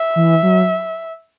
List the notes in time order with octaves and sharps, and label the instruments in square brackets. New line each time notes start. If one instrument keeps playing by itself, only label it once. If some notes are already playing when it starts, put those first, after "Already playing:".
Already playing: [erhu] E5
[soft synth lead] E3
F#3